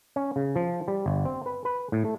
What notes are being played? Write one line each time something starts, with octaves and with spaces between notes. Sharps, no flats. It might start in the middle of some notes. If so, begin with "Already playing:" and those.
C#4
C#3
F3
G3
G1
C4
B4
B4
A2
A3